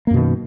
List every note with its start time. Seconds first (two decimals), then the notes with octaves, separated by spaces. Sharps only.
0.07 A#3
0.11 F#2
0.14 B2
0.17 D#3